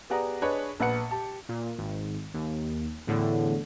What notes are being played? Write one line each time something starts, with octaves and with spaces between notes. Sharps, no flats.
B3 G4 G#4 D5 F#5 A#5
D4 G#4 B4 C#5 D#5
A#1 B3 B4 F#5 C#7
G4 A5
A#2
G#1
D#2
E2 A2 D3